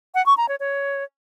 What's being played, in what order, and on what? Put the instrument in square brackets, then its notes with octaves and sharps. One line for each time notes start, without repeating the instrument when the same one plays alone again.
[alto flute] F#5
C#6
A#5
C#5
C#5